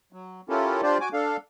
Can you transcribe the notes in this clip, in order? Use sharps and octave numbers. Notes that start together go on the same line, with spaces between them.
F#3
C#4 E4 F4 G4 A4 A#4
D4 F4 G4 C5 D5
F#4 G#5 D6
D4 A4 F5